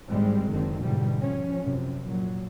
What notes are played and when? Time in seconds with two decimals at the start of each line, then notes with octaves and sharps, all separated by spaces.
0.11 G#1 A2 G3 G#3 C4
0.48 F#1 D3 D#3 C4
0.81 G#2 B2 D3 E3 G3
1.20 F3 C#4
1.62 F#2 C3 F3
2.04 F#2 A#2 F#3